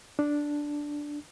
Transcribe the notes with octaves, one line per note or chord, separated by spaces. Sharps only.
D4